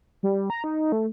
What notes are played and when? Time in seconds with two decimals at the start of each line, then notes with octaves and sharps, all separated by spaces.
0.23 G3
0.50 A#5
0.64 D#4
0.92 A3